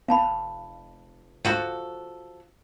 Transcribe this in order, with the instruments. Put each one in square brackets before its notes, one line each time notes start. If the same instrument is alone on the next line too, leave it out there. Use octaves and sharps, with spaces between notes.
[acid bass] F1 [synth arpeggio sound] B3 [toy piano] F5 A5 B5
[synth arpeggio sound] D2 G#2 [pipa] F3 F#4 A4